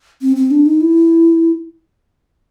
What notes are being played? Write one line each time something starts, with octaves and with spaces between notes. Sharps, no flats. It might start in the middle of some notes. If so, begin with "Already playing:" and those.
C4
C4
D4
D#4
E4